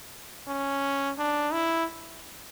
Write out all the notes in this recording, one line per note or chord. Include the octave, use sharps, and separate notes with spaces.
C#4
D4
E4